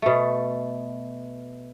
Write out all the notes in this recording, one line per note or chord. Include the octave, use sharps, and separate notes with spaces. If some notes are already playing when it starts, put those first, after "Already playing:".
B2 A3